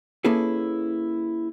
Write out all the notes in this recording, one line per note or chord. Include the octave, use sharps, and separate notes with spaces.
A#3 C#4 E4 G#4 A4 B4